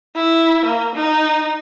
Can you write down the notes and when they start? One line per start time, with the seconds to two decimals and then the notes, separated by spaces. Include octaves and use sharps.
0.16 E4
0.65 A#3
0.95 D#4